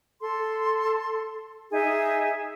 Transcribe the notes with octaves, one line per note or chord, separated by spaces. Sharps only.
A4 C6
D#4 G#4 E5